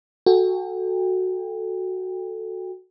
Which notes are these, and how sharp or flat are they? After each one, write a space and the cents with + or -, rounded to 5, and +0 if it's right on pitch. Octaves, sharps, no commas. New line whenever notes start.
F#4 +0 A4 +0 G5 +30